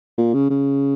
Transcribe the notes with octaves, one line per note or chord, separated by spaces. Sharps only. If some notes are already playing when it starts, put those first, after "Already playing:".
A#2
C#3
C#3